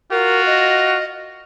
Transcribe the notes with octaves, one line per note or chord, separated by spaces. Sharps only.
F4 F#4 A#4
D#5